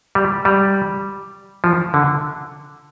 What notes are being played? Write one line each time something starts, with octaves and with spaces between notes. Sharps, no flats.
G3
G3
F3
D3